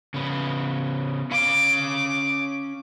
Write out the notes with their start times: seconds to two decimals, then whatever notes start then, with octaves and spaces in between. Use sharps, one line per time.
0.14 C#3 B3
1.31 C#4 F5 D6